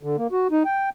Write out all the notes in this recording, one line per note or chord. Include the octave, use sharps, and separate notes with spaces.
D3
A#3
F#4
D#4
G5